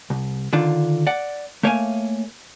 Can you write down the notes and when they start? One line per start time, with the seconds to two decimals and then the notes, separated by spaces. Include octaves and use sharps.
0.10 C2
0.53 D3 D#3 D4 F4
1.07 D5 F#5
1.63 A3 A#3 C#5 E5 F5 G#5